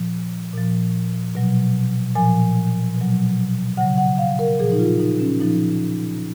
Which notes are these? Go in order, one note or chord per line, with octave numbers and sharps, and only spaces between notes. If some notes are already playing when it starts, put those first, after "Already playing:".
Already playing: A#2 F3
A#2 F3
B2 F#3
A#2 F3 G#5
B2 F#3
C#3 F#3 F#5
F#5
F5
A#4
A#2 F3 G#4
D#4
F4
D#4
C#4
A#2 F3 D#4